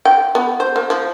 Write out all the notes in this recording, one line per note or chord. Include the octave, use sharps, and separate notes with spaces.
G5
B3
C5
A#3
F3